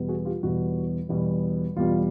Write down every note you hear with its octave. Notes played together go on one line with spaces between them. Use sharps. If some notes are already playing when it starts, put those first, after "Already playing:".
Already playing: E2 B2 G3 B3
F#4 G#4
F4 G4
E2 B2 G3 B3 F#4
E2 B2 G3 B3
E2 B2 G3 B3 F4